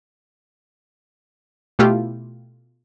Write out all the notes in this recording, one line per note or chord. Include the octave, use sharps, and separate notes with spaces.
B2 A3 E4 F4 G4